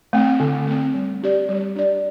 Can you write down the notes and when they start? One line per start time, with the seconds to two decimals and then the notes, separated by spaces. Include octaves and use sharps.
0.13 A3 C4
0.40 D3
0.67 A3 C4
0.94 G3
1.22 D4 G4 D5
1.49 G3
1.76 D4 G4 D5